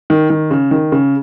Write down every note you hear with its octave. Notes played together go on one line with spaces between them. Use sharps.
D#3
D#3
C#3
D#3
C#3